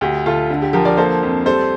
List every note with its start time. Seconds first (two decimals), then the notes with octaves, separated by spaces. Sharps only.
0.01 D2 G4
0.26 D2 F4 A4
0.50 D3
0.62 G4
0.73 F3 G4 A#4
0.85 A#4 D5
0.97 A#3 A4 C5
1.22 F2
1.46 G3 A4 C5